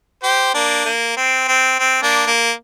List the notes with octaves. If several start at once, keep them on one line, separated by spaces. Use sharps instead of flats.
G4 C5
A#3 D4
A#3
C4
C4
C4
A#3 D4
A#3